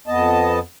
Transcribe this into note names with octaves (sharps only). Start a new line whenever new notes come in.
F2 B3 D#5 A5